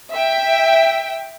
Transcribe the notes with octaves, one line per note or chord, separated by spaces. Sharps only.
E5 G5